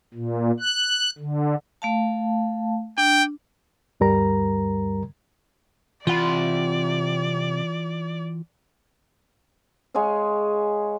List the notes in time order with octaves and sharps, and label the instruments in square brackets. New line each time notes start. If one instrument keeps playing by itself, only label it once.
[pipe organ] A#2
F#6
D3
[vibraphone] A3 F5 A5
[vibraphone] D4 [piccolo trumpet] G5
[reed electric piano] D2 G2 G3 A#4 A#5
[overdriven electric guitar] C3 B5 [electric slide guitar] E3 F#5 [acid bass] F4 [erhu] D5
[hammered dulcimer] G#3 G#4 C#5 F5